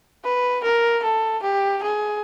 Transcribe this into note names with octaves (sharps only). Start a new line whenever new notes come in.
B4
A#4
A4
G4
G#4